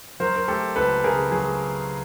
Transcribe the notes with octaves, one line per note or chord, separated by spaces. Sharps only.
F#3 A#4 C5
A#4
A3 G4 A4
C#2 A4 B4
C#3 G#4 A#4
F#3 G#4